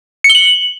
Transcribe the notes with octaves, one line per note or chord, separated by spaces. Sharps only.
C#7
G7
F#7